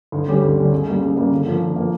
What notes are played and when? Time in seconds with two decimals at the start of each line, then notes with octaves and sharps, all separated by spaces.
0.12 D2
0.28 D3 G3 C#4 G4
0.43 D2
0.56 D3 G3 C#4 G4
0.72 C#2
0.87 C#3 G3 A#3
1.01 C#2
1.17 C#3 G3 A#3
1.32 D3
1.46 F3 A#3
1.61 D3
1.76 F3 A#3